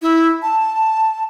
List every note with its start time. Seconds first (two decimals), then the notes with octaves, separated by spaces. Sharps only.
0.02 E4
0.42 A5